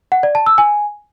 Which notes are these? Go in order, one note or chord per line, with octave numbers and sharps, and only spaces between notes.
F#5
D5
A5
E6
G#5